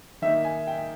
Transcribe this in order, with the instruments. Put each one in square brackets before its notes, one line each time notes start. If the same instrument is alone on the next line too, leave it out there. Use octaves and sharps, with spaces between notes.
[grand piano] D#3 A#3 D#4 E5
G#5
G5